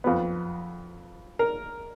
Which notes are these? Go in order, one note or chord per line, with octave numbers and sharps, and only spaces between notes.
F2 F3 B3
A#4